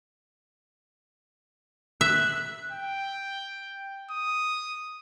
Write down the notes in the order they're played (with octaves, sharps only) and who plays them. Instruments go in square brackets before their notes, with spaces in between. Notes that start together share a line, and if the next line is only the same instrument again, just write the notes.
[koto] E5 [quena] F#6
[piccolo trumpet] G5
D#6